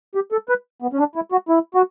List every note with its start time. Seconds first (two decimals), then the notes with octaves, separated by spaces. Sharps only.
0.15 G4
0.32 A4
0.49 B4
0.82 B3
0.93 C#4
0.99 D4
1.15 E4
1.32 F#4
1.49 E4
1.74 F#4